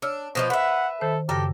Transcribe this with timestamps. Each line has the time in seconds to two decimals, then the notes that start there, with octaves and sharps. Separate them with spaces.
0.02 D4 C#5 E6 F6
0.35 B2 F3 F4 C5 D#5
0.50 B4 E5 F#5
1.01 D#3 A4 C5
1.29 F#2 C#3 G4 A4 A#6